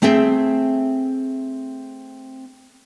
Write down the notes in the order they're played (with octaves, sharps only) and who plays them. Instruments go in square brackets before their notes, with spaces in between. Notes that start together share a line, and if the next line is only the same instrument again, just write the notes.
[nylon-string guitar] A3 C4 G#4 E5 G5